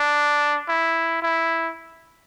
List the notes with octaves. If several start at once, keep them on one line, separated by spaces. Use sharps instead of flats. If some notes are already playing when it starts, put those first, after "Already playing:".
Already playing: D4
E4
E4